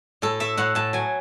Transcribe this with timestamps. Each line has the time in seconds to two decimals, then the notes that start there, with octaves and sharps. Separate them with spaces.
0.22 A2 A4
0.40 A3 E5
0.57 A2 F#5
0.75 A2 A5
0.93 F#3 G#5